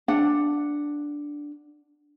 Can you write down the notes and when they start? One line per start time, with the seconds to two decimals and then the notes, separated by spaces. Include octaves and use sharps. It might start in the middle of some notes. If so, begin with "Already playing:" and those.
0.08 D4 F#5